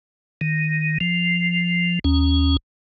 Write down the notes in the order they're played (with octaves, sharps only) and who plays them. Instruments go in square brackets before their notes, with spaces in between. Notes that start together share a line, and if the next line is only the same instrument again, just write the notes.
[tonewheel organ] D#3
F3
D#2 C#4